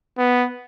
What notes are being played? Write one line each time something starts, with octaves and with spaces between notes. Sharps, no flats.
B3